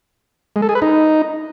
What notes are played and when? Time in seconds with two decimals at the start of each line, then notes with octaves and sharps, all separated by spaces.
0.56 G#3
0.62 A4
0.69 G#4
0.75 B4
0.82 D#4